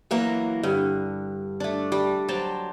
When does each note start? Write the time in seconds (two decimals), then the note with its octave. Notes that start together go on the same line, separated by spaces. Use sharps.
0.11 E3 F#3 A#3
0.63 G2 D3
1.60 A3 D4
1.92 G3
2.28 F#3 C5 G5 A5